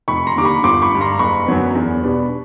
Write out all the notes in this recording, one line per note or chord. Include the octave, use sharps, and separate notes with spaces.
F1 B5 C#6
A#5 C6
D#2 D3 G3 D6
B5 C#6
G1 C6 D6
B5 C#6
G2 D3
A#5 C6
F#1 B5 C#6
F#2 D3 F#3 B3
E2
B2 G3 B3 D4